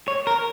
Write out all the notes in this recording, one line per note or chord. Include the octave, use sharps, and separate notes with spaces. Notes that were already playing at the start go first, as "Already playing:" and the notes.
C#5
A#4